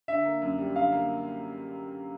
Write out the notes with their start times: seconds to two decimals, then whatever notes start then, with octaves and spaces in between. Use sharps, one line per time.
0.08 D3 E5
0.25 A#3
0.42 F#2
0.58 G3
0.76 D3 F5
0.92 A#3